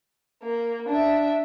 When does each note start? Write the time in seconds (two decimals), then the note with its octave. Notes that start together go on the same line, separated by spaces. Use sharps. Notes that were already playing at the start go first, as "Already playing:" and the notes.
0.43 A#3
0.89 D4 E5